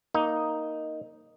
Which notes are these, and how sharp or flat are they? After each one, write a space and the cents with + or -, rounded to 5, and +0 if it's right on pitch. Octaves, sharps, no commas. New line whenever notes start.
A#3 +0 D#4 +0